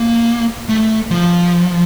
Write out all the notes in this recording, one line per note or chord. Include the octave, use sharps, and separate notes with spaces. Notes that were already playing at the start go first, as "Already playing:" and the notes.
Already playing: A#3
A3
F3